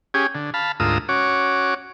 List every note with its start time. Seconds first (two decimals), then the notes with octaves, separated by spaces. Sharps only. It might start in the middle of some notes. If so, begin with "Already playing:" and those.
0.14 C#4 G4 G#4
0.35 D3
0.54 F5 A5 B5
0.80 D2 G#2 F4 A#4 D#6 E6
1.09 C#4 F#4 C#5 D6